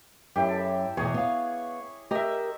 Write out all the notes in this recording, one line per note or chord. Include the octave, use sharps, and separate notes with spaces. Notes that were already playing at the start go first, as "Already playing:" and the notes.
F#2 E4 G4
A4
E2 B2 G#4 C#5
B3 F5
G4 A#4 D#5 E5